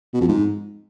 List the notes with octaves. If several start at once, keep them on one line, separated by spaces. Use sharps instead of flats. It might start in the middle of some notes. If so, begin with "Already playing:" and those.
B2
F2
G#2